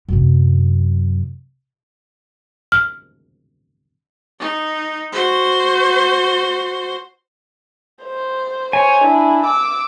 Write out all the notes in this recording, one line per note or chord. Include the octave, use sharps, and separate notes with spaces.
F#2 C3
F6
D#4
F#4 C5
C5
C5 C#5 G#5
D4 E4
D6 E6